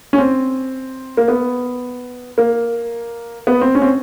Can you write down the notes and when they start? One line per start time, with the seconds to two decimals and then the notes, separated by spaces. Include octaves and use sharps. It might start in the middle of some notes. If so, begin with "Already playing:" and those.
0.13 C#4
0.18 C4
1.17 A#3
1.28 B3
2.38 A#3
3.47 B3
3.61 C4
3.75 C#4
3.82 C4